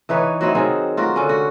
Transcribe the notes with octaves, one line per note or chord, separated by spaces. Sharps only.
E3 D#4 B4 C#5
F#3 C4 D#4 E4
D#3 F#3 C4 G#4
F4 F#4 A#4
D3 C#4
F#4